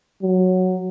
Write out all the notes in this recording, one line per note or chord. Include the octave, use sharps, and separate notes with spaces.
F#3